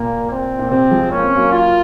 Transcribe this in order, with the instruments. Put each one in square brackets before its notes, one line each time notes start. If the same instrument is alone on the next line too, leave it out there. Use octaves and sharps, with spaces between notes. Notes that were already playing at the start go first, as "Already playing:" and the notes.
Already playing: [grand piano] A#2 [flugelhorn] A#3
[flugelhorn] C4
[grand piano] A#2
[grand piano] C3 [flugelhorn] C4
[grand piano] F3 G#3
[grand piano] A#3 [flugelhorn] C#4
[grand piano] C4
F#3 A#3
[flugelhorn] F4